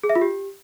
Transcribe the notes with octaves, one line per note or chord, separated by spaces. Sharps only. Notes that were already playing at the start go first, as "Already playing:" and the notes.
G#4
E5
F4
G4